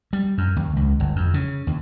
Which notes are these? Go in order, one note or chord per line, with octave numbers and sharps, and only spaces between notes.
G3
F#2
D#2
C#2
G1
F2
C#3
D#2